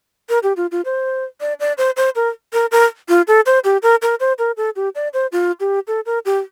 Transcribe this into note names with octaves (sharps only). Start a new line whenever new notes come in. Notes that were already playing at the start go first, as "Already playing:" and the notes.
A#4
G4
F4
F4
C5
D5
D5
C5
C5
A#4
A#4
A#4
F4
A4
C5
G4
A#4
A#4
C5
A#4
A4
G4
D5
C5
F4
G4
A4
A#4
G4